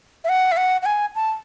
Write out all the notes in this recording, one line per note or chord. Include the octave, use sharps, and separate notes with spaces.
E5
F#5
E5
F#5
F#5
G#5
A5